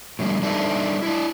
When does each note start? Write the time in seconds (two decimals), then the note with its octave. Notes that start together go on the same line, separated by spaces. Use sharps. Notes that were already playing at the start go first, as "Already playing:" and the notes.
0.19 A2 D3 E3 G3 A3
0.42 G3 D4 D#4 A4 D#5 E5
1.03 D4 E4